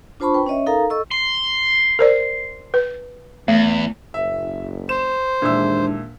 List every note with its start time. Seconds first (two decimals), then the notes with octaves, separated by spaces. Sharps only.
0.20 D4 F4 C5 A5 B5 C#6
0.34 B4 G5
0.46 C#4 C#5 D#5 E5
0.66 D#4 A4 A#4 F5 A#5
0.90 A4 D#5 C#6 E6
1.11 C6
1.99 A#4 C5 D5
2.74 B4
3.48 E2 A3
4.14 F#1 E5
4.89 C5 E7
5.42 D#2 A#2 E3 G#3 D4 E5 E6